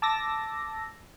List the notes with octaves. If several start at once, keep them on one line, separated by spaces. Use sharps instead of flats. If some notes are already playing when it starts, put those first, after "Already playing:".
A5 D6 E6 A6 A#6